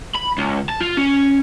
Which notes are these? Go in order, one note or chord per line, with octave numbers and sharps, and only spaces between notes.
B5
C#2
A5
F4
C#4